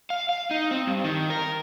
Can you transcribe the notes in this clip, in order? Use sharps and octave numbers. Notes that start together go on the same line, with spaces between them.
F5
F5
D#4
C4
G2
D#3
A#4